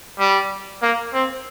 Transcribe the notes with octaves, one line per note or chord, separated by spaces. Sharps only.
G3
A#3
C4